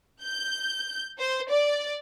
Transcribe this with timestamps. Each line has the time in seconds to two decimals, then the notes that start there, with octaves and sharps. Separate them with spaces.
0.23 G6
1.19 C5
1.51 D5